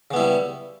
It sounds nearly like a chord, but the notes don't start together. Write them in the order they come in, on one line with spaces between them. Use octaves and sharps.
C#3 B3 E4 G3